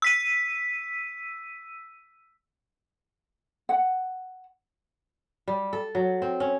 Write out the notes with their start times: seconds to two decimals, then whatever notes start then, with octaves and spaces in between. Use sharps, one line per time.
0.02 E6 B6 D#7
3.69 F#5
5.48 G3
5.73 A4
5.95 F#3
6.22 C4
6.40 C#4